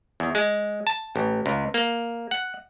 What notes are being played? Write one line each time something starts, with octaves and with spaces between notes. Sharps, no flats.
E2
G#3
A5
A1
C#2
A#3
F#5